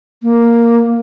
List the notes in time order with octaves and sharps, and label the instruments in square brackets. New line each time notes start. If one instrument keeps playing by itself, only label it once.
[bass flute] A#3